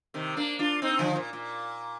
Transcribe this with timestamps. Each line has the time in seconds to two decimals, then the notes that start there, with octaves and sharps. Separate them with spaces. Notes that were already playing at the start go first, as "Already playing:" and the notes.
0.14 C3 D#3
0.37 A#3 D4
0.59 D4 F4
0.82 C4 D#4
0.99 D3 F3
1.16 A#2
1.33 A#2